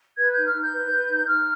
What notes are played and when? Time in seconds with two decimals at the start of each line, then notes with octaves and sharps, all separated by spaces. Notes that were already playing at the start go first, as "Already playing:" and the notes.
0.18 B4 G#6
0.32 D#4 G6
0.45 F6
0.54 D#4
0.60 G6
0.72 B4
0.91 B4
1.09 D#4
1.26 D#4 F6